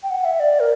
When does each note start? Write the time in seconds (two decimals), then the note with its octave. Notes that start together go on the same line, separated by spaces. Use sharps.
0.03 G5
0.10 F#5
0.25 E5
0.40 D5
0.60 A#4